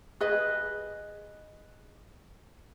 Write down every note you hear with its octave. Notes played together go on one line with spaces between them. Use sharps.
G#4 B4 D#5